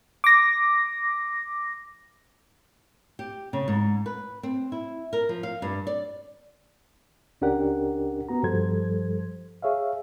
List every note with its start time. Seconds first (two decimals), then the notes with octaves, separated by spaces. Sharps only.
0.24 D6 A#6
3.19 G4
3.53 C#3
3.68 G#2
4.06 B4
4.43 C4
4.72 E4
5.13 A#4
5.29 F3
5.43 F5
5.62 G2
5.87 D5
7.41 C#2 C#4 D4 G4 A#4 F#5
8.29 B3 F#4 A#5
8.43 G2 F3 G3 A4 C5 G#6
9.62 G#4 C#5 E5 F5